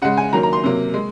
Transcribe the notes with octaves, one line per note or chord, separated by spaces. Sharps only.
C#3 G#3 F#5
G#5
D#3 F#3 A#3 A#5
A#5
C6
C3 F#3 A#3
G#3